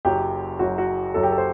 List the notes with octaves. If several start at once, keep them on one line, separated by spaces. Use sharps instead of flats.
F#1 F#2 F#3 G4
F#1 F#2 F#3 F#4
F#4
F#1 F#2 F#3 A4
G4
A4
C5